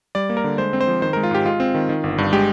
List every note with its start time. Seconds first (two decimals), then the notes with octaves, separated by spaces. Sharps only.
0.15 G3 D5
0.30 A#3
0.37 A#4
0.44 D3
0.58 G#3 C5
0.73 C4
0.81 C5
0.88 F3
1.02 D#3 C5
1.13 A#4
1.17 G#3
1.23 F4
1.31 G#2 G4
1.45 G#3 F4
1.60 C4
1.75 D#3
1.89 D#3
2.04 G1
2.18 G2
2.33 G#3 G4